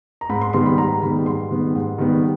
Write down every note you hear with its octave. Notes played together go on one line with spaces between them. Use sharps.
A#5
G#2 B5
C6
D#3 G3 B3 C6
B5
G#2 A#5
D#3 G3 B3 B5
G#2 C6
D#3 G3 B3
G#2
D#3 G3 B3